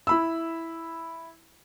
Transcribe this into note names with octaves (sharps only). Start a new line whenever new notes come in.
E4 B5 E6